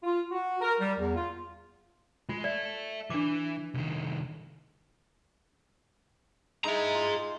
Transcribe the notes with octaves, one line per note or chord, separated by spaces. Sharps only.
F4
F#4
A#4
G3
E2
F4
G#3 F4
A4 D5 E5
E3 D4 D6
C2 D#3
G#3 D#4 E4 G#4 A#5
F4